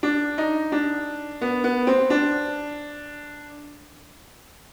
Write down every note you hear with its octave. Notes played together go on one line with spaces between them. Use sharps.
D4
D#4
D4
B3
B3
C4
D4